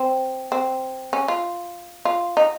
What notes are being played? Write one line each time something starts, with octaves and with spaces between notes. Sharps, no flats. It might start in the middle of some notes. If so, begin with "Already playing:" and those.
Already playing: C4
C4
C#4
F4
F4
D#4